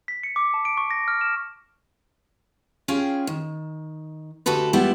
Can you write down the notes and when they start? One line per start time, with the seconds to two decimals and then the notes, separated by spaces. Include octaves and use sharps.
0.08 B6
0.23 C#7
0.36 D6
0.54 A5
0.65 D7
0.77 C#6
0.91 A#6
1.08 F6
1.21 E7
2.88 C#4 F4 G#4 G5
3.27 D#3
4.46 D2 F#4 G4 A4 B4
4.73 G3 G#3 B3 E4 F4 G4